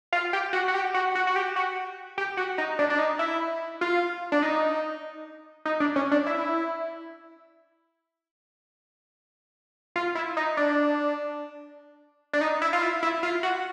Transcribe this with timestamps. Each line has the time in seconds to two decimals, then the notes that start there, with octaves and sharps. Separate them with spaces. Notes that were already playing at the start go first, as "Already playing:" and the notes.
0.13 F4
0.33 G4
0.53 F#4
0.68 F#4
0.74 G4
0.94 F#4
1.15 F#4
1.27 F#4
1.36 G4
1.56 F#4
2.18 G4
2.37 F#4
2.58 D#4
2.79 D4
2.90 D4
2.99 D#4
3.19 E4
3.81 F4
4.32 D4
4.42 D#4
5.65 D#4
5.80 D4
5.96 C#4
6.11 D4
6.26 E4
9.96 F4
10.15 E4
10.37 D#4
10.57 D4
12.33 D4
12.41 D#4
12.62 E4
12.73 F4
12.82 E4
13.03 E4
13.23 F4
13.43 F#4